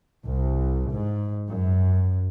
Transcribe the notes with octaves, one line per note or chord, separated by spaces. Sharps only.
C2
G#2
F#2